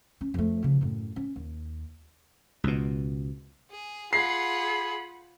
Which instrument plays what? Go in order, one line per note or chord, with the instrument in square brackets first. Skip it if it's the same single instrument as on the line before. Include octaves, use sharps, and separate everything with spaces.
[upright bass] C#4
F2 A3
C#3 F3
F#2 A2
C#4
D#2
[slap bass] C#2 B2
[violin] G#4
[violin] F4 F#5 [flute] G#4 [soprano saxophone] B5 [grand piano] C7